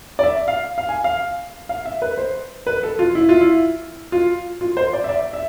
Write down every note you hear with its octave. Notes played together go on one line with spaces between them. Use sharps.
D5
E5
F5
F5
G#5
F5
F5
E5
B4
C5
B4
A4
F4
E4
F4
E4
F4
F4
C5
D5
E5
D5
E5